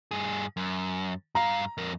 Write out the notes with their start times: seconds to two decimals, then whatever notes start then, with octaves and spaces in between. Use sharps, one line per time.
0.11 G2 G#4
0.57 F#2
1.35 G2 F5 A#5
1.78 F2 A#4